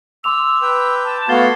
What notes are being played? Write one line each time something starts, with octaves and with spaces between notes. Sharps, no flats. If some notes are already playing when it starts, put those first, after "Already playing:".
C6 D6 E6 F7
B4 G5
A5
A3 B3 F#4 F5 G#6 A6 G7